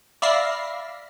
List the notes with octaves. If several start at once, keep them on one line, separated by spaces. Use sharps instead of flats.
D5 E5 F5 B5 A#6 C7